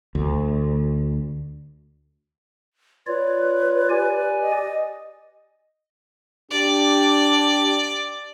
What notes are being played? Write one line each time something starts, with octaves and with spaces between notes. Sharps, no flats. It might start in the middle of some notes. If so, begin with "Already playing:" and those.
D2
F4 B4 C#5 D5
G4 D5 G#5
D#5
D4 G4 D5